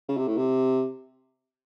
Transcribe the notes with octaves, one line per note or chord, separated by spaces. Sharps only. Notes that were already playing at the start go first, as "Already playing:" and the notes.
C#3
C3
A2
C3